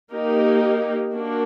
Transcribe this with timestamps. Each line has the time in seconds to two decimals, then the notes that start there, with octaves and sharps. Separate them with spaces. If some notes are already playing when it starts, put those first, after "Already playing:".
0.11 A#3 D#4 G4 A#4
1.13 A#3 D4 F#4